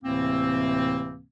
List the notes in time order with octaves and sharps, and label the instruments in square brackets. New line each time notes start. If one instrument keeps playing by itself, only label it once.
[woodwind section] D2 A2 C3 E3 A#3 C4